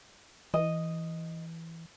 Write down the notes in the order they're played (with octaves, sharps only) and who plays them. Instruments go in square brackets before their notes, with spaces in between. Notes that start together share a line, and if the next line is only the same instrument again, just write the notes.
[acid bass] E3 [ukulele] D#5